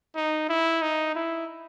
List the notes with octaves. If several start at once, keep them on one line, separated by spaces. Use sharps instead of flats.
D#4
E4
D#4
E4